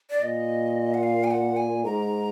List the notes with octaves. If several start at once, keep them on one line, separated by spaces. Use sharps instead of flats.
D5
A#2 D#5
F#5
F5
G#5
F#5
G#5
G#2 A#5